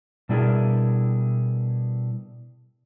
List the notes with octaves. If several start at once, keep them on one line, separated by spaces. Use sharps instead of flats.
B2 G3 D4 E4 G#4 A#4